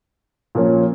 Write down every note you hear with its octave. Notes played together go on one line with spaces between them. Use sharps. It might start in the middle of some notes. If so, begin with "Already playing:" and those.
A#2 F3 A#3 C#4